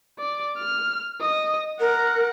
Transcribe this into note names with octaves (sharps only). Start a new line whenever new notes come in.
D5
F6
D#5
A#4 F#5